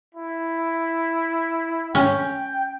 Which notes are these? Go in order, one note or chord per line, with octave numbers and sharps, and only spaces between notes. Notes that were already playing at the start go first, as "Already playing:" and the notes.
E4
C#4 G5